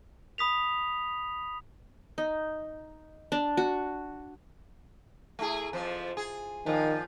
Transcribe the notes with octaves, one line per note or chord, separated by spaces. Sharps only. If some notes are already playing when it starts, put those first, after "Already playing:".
B5 D#6 B6 F7
D#4
D4
F#4
A3 E4 G#4
F2 F3 C5
G#4
A#2 D#3 F3